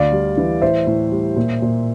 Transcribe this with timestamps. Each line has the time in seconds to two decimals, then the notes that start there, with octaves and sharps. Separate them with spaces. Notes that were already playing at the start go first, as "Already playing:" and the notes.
Already playing: D2 D5 F5
0.12 G3
0.37 E3
0.61 A2 C5 E5
0.87 A2
1.11 G3
1.36 A#2
1.62 A#2